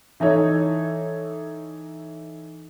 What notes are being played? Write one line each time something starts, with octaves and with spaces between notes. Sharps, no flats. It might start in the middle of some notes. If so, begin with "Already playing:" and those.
E3 D#4 A4 C#5